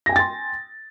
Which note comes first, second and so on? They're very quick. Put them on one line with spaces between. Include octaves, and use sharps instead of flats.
A#6 G#5 G5 A6 C6